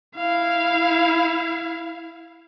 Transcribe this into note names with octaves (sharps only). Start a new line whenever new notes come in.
E4 F5